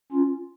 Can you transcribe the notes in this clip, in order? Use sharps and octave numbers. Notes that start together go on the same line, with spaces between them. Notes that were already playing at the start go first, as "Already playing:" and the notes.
C#4 F4